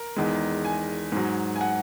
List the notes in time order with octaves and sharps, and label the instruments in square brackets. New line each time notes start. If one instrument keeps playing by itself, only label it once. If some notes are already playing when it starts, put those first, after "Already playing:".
Already playing: [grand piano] A#4
E2 D#3 G#3
G#5
G#2 F#3
G#5
F#5